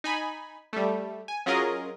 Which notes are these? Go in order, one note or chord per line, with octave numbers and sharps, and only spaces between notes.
D#4 G#5 B5
G3 A3
G#5
F#3 C#4 F4 G#4 A#4 D#5